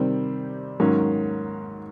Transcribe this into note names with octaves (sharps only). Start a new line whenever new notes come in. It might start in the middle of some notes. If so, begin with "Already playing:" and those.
Already playing: C3 D#3 G3 C4
G#2 D#3 F#3 A#3 C#4